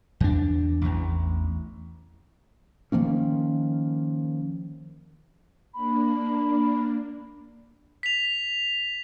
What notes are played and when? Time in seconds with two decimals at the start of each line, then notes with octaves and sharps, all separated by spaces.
0.20 E2 D4
0.81 A1 E2
2.92 D#3 F3 A#3 C#4
5.74 A#3 D4 B5
8.03 B6 F7